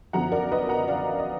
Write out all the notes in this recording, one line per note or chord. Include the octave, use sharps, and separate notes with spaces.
F#2 D3 F3 B3 F#5 A#5
A#4 D5
B4 D#5
F#5 A#5
D5 F5
D#5